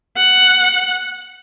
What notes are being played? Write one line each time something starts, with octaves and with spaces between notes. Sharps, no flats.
F#5